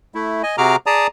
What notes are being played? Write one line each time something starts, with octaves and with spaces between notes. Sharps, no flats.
A3 E4
D#5 G#5
C3 F#4 G#4 A#5 D6 F6
G#4 D5 A5 A#5 D#6